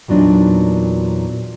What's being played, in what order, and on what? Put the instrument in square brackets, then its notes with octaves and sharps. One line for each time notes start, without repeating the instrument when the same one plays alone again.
[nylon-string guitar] E2 A#2 F#3 D4 D#4